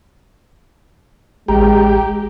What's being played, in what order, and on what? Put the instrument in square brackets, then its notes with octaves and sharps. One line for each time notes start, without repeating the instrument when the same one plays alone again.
[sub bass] A1 [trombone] G#3 [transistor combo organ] G4 [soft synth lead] A#5